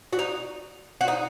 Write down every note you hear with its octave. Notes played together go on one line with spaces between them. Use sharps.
F#4
D#4
F#4
D#4